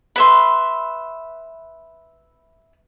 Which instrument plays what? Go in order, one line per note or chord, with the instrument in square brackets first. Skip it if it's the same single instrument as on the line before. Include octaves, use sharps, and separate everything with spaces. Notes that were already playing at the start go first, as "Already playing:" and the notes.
[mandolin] B4 E5 C6